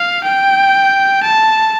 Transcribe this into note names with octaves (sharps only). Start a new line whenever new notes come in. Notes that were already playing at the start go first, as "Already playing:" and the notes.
Already playing: F5
G5
A5